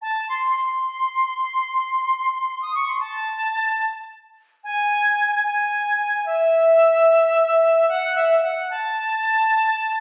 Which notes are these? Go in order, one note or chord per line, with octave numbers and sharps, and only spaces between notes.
A5
C6
C6
D#6
C#6
C6
A5
G#5
G#5
E5
F#5
E5
E5
F#5
A5